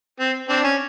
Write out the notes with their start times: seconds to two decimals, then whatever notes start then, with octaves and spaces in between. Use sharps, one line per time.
0.20 C4
0.49 C4 D4
0.64 C#4